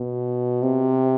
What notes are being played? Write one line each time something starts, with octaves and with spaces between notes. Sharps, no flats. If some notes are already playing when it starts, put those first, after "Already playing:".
Already playing: B2
C3